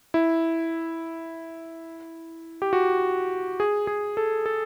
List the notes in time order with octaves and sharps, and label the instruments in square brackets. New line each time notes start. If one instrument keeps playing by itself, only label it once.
[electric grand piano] E4
G4
F#4
G#4
G#4
A4
A4